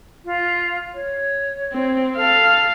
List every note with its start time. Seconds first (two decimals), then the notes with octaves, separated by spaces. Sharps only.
0.25 F4
0.94 C#5
1.73 C4
2.17 A4 F5